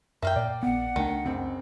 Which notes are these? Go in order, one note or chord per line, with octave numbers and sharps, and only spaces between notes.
F#2 A#3 E5 F5 G5
A#2 D5
A#1 B3 F#5
C#2 D#3 A3 D4
F#1 C4